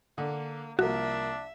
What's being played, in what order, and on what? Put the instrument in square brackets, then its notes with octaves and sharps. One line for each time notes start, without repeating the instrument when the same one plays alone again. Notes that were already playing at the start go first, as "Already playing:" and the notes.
[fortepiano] D3 [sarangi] A#3
[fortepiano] C2 F3 A#3 [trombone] D4 [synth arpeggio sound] F#4 [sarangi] E5